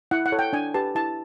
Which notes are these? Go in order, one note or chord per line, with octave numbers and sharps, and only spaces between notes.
E4 F#5
F#5
A4 C#5
G5
D4 G#5
G4 B4 A5
E4 A5